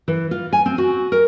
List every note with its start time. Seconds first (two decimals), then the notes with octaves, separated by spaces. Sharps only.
0.08 E3
0.31 F4
0.53 G#5
0.66 C4
0.78 F#4
1.12 A#4